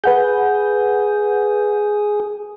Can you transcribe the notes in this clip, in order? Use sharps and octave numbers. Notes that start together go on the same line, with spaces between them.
G#4 B4 F#5 G6